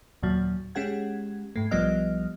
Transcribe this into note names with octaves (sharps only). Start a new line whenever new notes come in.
D#2 A#2 F#3
G#3 C#4 G4 F#5 G#6
G#2 A3
B1 F3 G3 B3 D#5 F6